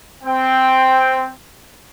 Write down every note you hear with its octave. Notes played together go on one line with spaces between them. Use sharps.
C4 G5